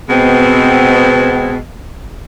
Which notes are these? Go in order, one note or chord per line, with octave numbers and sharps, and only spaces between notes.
B2 G#3 B3 C4